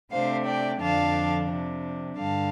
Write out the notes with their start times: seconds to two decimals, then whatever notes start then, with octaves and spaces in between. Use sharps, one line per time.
0.12 C3 A3 D4 C5 F5
0.46 D5 G5
0.80 F2 D3 F3 D4 F5 A5
1.49 C3 F3 D4
2.17 G2 D3 G3 F5 A5